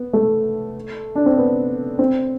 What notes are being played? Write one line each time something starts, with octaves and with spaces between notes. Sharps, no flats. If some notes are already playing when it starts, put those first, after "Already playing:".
Already playing: B3
A3
D4
C4
B3
C4